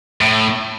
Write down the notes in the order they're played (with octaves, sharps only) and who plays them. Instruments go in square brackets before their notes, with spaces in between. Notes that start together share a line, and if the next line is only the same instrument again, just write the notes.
[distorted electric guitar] A2